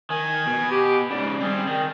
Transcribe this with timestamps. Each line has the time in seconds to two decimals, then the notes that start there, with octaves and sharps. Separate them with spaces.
0.10 D#3 G#5
0.47 B2
0.71 G4
1.11 G#2 C#3 D5
1.40 G3 C4 G#4
1.67 D#3 C4